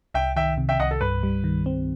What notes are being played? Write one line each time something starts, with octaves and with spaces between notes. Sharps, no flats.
C2 E5 G5
D#3 E5 G5
C3
E5 G5
C2 D#5 F#5
A4
G2 B4
G3
D#3
C4